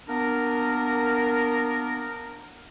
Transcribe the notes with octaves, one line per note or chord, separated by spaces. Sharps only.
A#3 B3 D4 A#4